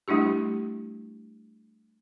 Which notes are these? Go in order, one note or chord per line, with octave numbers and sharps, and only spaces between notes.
G3 A3 D4 E4 G4